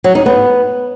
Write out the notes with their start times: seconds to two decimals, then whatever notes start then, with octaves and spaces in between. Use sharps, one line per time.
0.04 F#3
0.15 D#4
0.26 B3